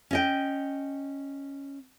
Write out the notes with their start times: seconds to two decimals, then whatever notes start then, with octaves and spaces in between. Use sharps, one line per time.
0.11 C#4 D#5 G5